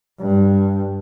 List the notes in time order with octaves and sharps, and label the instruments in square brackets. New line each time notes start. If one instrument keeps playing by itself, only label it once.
[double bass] G2